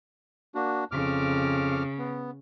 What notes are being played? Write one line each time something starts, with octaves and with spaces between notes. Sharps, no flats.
A#3 D4 F#4
F2 C#3 D6 F6
B3